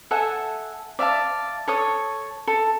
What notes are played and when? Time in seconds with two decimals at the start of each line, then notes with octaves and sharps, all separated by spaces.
0.11 A4 E5 F#5 G#5
0.99 D5 E5 F5 A5
1.68 A4 C#5 D#6
2.47 A4